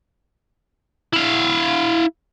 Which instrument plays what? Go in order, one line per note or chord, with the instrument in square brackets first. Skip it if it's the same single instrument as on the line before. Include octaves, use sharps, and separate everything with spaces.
[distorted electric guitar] E4 F5